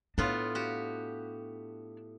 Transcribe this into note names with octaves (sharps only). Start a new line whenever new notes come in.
A2 B3 D4 F4
F#4 G4